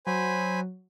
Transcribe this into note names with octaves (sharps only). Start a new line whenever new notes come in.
F#3 C5 G#5 B5